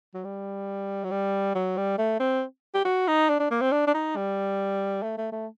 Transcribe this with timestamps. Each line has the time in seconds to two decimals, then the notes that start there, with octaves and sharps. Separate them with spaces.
0.14 F#3
0.24 G3
1.04 F#3
1.11 G3
1.55 F#3
1.77 G3
1.98 A3
2.20 C4
2.74 G4
2.85 F#4
3.08 D#4
3.29 D4
3.40 D4
3.51 A#3
3.61 C4
3.72 D4
3.87 D4
3.94 D#4
4.16 G3
5.03 A3
5.18 A3
5.32 A3